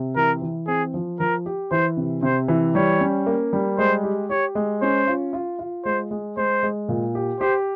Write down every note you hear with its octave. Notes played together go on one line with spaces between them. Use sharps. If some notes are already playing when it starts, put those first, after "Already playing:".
Already playing: C3
E3 A#4
E3
C4 G#4
F3
F3 A#4
G4
E3 C5
C3
C3 C5
E3
G3 C#5
C#4
A#3
G3
G#3 C5
G4
G4 C#5
G#3
C#4 C5
F4
F4
F4
G#3 C5
G#3
G#3 C5
G#3
A#2
G4
G4 C5